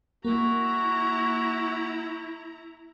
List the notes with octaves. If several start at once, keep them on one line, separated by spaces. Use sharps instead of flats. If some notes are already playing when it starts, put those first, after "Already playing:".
A#3 E4 F#4 A#5